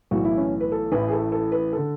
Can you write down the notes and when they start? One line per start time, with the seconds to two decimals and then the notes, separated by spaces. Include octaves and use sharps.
0.11 B1 A2 E3 F#4
0.24 E4
0.38 C#4
0.61 B4
0.72 A4
0.92 A1 A2 E3 B4
1.08 G#4
1.12 A4
1.32 A4
1.52 B4
1.73 D3 A4